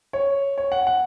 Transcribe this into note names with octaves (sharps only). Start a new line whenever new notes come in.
C#5
C#5
F#5
F#5